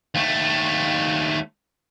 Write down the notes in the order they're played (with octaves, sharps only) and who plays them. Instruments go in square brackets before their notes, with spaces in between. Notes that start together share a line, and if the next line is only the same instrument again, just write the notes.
[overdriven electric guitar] D#2 A3